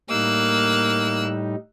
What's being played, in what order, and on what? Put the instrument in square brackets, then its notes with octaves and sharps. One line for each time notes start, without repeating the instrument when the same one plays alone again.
[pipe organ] A2 G3 D#4 [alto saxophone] A#3 [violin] E6 F#6